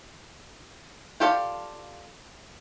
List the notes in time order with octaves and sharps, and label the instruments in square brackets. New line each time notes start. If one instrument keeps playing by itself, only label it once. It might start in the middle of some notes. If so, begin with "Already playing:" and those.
[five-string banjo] F4 G4 A4 D5 F5